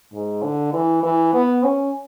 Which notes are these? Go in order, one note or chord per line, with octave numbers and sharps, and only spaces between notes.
G#2
D3
E3
E3
B3
C#4